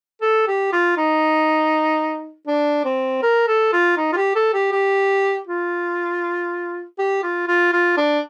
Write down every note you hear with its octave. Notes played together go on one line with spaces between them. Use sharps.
A4
G4
F4
D#4
D4
C4
A#4
A4
F4
D#4
F4
G4
A4
G4
G4
F4
G4
F4
F4
F4
D4